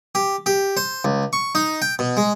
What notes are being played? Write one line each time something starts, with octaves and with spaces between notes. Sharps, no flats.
G4
G4
C5
C#2
C#6
D#4
G5
B2
G#3